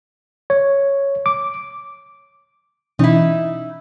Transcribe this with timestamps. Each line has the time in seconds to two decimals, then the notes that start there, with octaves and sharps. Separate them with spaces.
0.50 C#5
1.26 D6
2.99 B2 E3 C#4 D#4 E4